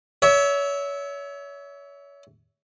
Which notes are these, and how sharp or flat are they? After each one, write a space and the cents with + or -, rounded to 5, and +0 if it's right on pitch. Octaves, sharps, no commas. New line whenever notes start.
C#5 +30 E5 -15